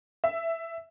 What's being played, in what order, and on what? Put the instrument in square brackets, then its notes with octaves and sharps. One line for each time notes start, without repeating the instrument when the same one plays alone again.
[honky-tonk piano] E5